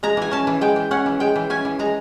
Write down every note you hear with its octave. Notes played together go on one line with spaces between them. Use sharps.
G#3 A#5
E3 G#5
C#4 A5
E3
G#3 G5
E3
C#4 F#5
E3
G#3 G5
E3
C#4 G#5
E3
G#3 A#5